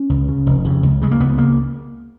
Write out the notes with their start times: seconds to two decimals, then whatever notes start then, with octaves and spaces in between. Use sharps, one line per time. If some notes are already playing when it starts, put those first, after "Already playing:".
Already playing: C#4
0.10 C#2
0.28 C#3
0.46 F1
0.65 F2 C#3
0.83 C#2
1.02 C#3 G#3
1.11 A#3
1.20 C#2 B3
1.38 C#3 A#3